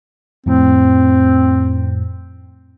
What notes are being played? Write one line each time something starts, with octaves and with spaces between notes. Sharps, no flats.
F2 A2 C4